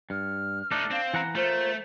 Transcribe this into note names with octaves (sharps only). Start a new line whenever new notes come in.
G2 F6
A3 D4 D#4
C4 F5
E3 F#5 A#5
A3 F4 A#4 C5